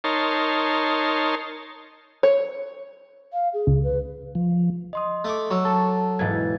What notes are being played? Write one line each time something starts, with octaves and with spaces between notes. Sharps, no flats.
D#4 A#4 C#5 A5 C6
C#5
F5
G#4
C#2
B4
F3
D#5 C6 D#6
A3 C#6 D6
F#3 C#6 E6
A4 A5
E1 G#2 E3 G#6 A6